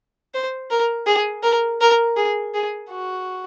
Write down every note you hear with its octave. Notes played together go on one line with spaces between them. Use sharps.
C5
A#4
G#4
A#4
A#4
G#4
G#4
F#4